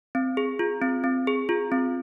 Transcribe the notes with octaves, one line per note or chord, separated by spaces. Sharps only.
C4
G#4
F4
C4
C4
G#4
F4
C4